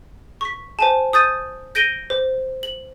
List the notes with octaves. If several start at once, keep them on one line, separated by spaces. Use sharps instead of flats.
C#6 B6
C5 G#5 A5
D#6 G6 A6 D#7
G6 A#6 D7 D#7 G7
C5
F#7